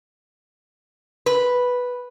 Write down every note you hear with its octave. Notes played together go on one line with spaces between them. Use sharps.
B4